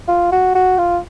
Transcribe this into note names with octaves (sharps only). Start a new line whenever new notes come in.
F4
F#4
F#4
F4